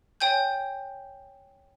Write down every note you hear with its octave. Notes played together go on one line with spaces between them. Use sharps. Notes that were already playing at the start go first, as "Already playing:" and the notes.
C#5 G5 G#5 G6